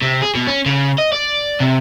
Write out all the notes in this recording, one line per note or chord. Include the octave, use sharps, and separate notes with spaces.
C3
G#4
B2
C#4
C#3
D#5
D5
C3